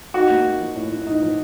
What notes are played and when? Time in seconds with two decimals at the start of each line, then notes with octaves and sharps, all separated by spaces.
0.14 D#4 F#4
0.30 A#3
0.45 A#3
0.60 F3
0.76 A2
0.91 A2
1.07 D#4
1.22 F3